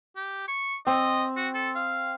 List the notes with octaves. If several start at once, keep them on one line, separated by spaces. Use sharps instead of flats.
G4
C#6
C4 D#5
F#4
A4
F5